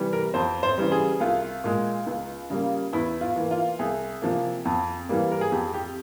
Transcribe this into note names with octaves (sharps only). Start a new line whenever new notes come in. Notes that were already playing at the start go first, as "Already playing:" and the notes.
Already playing: C3 E3 G3
A#4
F2 C5
C5
C#3 E3 G3
G#4
C2 F4
A#2 G#3
C#2
C#3 G3 A#3
E2 E4
F4
E3 A#3
F4
C2 G#4
C3 F3 A#3
F2
E3 G3 A#3
A#4
G#4
F2 G4
G4